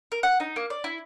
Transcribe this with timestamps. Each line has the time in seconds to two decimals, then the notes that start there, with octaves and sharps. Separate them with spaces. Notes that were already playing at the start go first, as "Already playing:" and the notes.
0.12 A#4
0.23 F#5
0.40 D#4
0.56 A#3
0.70 D5
0.84 E4